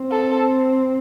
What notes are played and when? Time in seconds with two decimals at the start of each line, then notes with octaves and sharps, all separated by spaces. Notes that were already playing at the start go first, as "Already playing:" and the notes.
Already playing: C4
0.11 A4